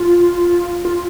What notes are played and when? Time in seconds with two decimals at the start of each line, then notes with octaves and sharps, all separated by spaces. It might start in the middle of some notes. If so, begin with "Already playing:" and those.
Already playing: F4
0.85 F4